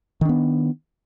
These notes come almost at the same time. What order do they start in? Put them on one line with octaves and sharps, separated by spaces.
D#3 D4 B3